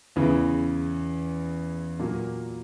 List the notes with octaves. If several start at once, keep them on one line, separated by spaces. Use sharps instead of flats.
E2 C#3 E3
A#2 F#3 A#3